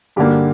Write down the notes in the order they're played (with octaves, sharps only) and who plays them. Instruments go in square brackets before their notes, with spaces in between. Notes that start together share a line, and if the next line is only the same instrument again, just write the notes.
[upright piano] G2 D3 A#3 G4